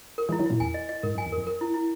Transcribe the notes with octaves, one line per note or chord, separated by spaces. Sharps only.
A#4
E3 G#3
E4
D#3 F#3
F#2 A#2 E4
E2 G#5
D#5
D#5
G#2 A#4
F#2 G#5
E2
A#4
F#2
A#4
E4
E4